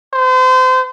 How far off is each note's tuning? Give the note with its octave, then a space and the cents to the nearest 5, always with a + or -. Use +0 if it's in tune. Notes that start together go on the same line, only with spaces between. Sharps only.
C5 -35